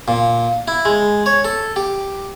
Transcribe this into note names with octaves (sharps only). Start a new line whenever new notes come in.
A#2
E4
G#3
C#5
A4
G4